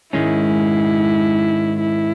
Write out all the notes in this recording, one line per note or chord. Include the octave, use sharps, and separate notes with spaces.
G#2 D#3 G#3 C#4 E4
E4